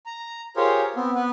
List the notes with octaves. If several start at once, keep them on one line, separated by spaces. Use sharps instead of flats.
A#5
F4 G4 G#4 A#4 C5 C#5
B3 C4
B3 B4